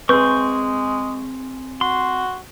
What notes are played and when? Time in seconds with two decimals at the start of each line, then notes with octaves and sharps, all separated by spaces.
0.09 G#3 C4 G#4 B4 C#6 G6
1.81 F#4 C6